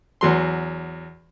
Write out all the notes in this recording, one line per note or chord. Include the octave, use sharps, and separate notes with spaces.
E2 F#3 C6